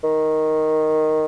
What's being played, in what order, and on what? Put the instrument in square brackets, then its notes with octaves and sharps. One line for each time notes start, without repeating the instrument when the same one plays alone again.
[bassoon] D#3